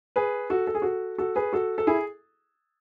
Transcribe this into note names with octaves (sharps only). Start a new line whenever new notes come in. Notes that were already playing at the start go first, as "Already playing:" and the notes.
G#4 B4
F#4 A4
A4
G#4
F#4 A4
F#4 A4
G#4 B4
F#4 A4
A4
E4 G#4